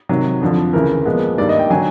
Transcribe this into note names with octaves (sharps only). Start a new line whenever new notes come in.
C3 D#3 F#3
F2 D3 F3
D2 C#3 E3 A#4
A#2 F3 G#3 B3
G2 D#3 G3 A#3 D4 D5
D#5
G5
D3 F#3 G#5